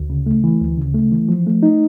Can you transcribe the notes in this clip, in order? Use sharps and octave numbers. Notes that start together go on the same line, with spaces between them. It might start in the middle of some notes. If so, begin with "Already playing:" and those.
Already playing: D2
C#3
A3
E3
D2
C#3
A3
E3
F3
A3
D#4